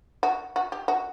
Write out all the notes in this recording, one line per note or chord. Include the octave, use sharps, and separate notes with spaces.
F#4
F#4
G4
F#4